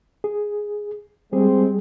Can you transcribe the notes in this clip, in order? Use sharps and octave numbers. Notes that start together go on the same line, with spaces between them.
G#4
G3 G#3 C4 G#4